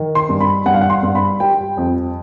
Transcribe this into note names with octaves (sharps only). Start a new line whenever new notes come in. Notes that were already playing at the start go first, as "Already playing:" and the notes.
Already playing: D#3
C6
G2
B5
G2 F#5
F5
F#5
C6
G2
B5
G3 G5
F2